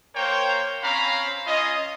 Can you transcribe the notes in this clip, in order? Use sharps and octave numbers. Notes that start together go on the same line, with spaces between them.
A#3 A#4 C5 C#5 G5
C4 C#4 F5 A#5 B5
C#4 F4 D#5